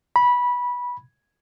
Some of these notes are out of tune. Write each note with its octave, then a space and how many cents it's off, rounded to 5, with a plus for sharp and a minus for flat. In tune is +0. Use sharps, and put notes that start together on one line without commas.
B5 -15